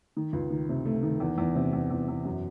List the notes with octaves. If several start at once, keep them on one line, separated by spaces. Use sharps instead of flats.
D#3
C#2
D#3
C3
A3
D#3
E2
E2
C3
E2
E2
E2
F#2